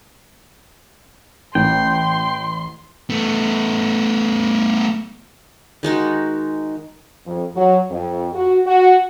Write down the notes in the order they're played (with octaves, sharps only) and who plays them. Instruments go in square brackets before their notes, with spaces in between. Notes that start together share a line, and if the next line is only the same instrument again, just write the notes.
[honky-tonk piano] A1 [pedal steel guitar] G5 [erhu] C6
[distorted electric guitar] A3 B3
[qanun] D#3 G#3 D#4 F#4
[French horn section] F2
F#3
F2
F#4
F#4